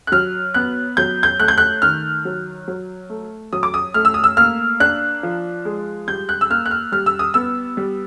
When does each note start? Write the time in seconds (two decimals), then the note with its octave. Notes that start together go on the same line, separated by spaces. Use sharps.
0.07 F#6
0.12 F#3 F6
0.54 B3 F#6
0.97 F#3 G6
1.23 G6
1.39 A3 F#6
1.48 G6
1.58 F#6
1.82 D#3 F6
2.25 F#3
2.68 F#3
3.10 A3
3.53 F#3 D#6
3.63 D6
3.74 D#6
3.94 A3 F6
4.05 E6
4.14 D#6
4.24 E6
4.37 A#3 F6
4.80 D4 F#6
5.23 F3
5.65 G#3
6.08 G3 G6
6.29 F#6
6.41 E6
6.50 A#3 F6
6.66 F#6
6.71 F6
6.92 G3 F6
7.06 E6
7.19 D#6
7.34 B3 E6
7.77 G3